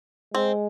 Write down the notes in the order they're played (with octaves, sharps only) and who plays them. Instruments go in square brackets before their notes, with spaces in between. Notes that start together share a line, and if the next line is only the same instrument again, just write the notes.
[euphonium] G#3 [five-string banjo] C4